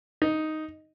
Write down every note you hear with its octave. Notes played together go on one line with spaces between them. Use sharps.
D#4